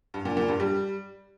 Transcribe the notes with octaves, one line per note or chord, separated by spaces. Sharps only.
G2
A#2
A#2
G2
G3